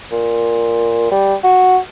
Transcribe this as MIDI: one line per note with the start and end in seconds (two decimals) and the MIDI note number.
0.12 1.11 46
1.11 1.35 55
1.44 1.77 66